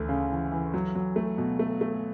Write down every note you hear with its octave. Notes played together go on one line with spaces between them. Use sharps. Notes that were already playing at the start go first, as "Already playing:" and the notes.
Already playing: D2 E3 A3
C#3
E3
E3
F#3
F#3
A3
B2
A3
A3